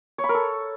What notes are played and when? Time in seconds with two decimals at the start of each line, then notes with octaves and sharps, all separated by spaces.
0.18 C#5
0.24 B5
0.29 A#4
0.34 A4